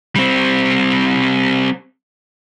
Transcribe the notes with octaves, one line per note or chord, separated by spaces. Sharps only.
G3 C4